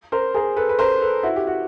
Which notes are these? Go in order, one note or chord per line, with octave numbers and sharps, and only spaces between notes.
A#4 C5
G#4 A#4
A4 B4
B4
A#4 C5
A4 B4
E4 F#4
G4
F#4